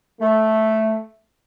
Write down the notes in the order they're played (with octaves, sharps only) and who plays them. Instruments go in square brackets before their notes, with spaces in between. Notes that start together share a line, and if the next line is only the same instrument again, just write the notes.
[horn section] A3